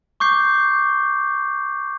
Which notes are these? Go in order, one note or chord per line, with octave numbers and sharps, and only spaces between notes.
C#6 D6 G6 C7